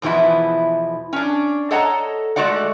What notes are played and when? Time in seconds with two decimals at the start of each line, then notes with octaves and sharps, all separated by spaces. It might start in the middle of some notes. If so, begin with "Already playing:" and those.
0.02 E2 B2 E3 F3 E4
1.13 C#4 D4
1.71 A4 C#5 D#5 F#5 A5 A#5
2.36 G#3 A3 F#4 D5 F#5